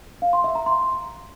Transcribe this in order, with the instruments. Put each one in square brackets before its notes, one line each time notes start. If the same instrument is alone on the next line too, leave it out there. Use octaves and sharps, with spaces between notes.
[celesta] F5
C6
E5
A#5
C6